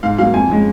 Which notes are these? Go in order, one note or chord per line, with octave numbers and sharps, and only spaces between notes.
G#2 F5
F#3 A#3 F5
F2 G#5
C#3 G#3